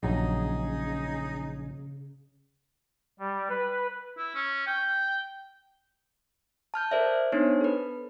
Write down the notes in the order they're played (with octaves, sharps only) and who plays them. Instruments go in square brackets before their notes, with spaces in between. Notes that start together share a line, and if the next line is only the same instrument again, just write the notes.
[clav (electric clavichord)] A#1 F#3 A#5 [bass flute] C#3 [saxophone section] D#4 G#4
[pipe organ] G3
B4
[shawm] E4
C#4
G5
[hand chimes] A5 F6 G6
A4 A#4 C5 D5 E5
B3 D4 D#4 C5 C#5
A4 B4